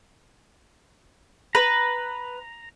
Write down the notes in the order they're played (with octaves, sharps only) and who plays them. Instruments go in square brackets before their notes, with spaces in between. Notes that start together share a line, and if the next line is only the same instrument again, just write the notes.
[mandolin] B4 [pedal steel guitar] A#5